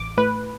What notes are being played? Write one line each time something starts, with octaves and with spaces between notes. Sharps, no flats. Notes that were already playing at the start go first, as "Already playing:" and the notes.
Already playing: A1 D6
A2 B4